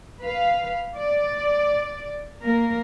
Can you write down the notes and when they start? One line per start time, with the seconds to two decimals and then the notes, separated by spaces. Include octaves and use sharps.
0.21 B4 F5
0.97 D5
2.42 A#3 A#4